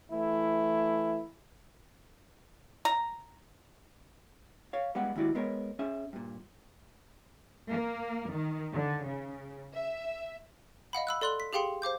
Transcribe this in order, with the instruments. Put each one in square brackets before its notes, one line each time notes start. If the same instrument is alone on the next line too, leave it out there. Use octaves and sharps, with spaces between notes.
[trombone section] E3 A3 E4
[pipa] A#5
[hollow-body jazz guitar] C#5 F5
G3 G#3 B3 F#5
D#2 G#2 E4 F#4 D5
G#3 B3 A#4 C#5
C#4 G#4 E5
G2 A#2
[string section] A#3
D#3
D3
C#3
E5
[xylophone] D#5 F5 F#5 B5
B5 E6 F#6
A4 D5 C6 F#6 F#7
B6
G4 G#4 F5 G5 C6 C#7
C5 F5 D6 G6